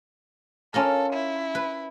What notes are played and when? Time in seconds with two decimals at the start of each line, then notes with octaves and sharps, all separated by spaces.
0.74 C#4 F4 A4 A#4
1.13 E4
1.55 B4